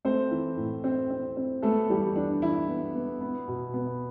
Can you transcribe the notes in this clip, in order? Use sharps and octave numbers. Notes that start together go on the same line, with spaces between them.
A3 C4 C5
E3
A2
C4
C4
C4
A3 B3 A4
E3 G3 G4
E3 D4
E3 E4
B3
B3
B3
B2
B3